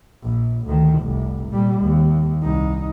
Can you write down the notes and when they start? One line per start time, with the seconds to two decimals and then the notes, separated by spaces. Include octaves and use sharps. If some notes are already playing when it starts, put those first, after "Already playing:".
0.23 A#1
0.67 D2 D#3
1.00 F1 C2
1.49 A#2 G3
1.81 D#2
2.43 C2 D#4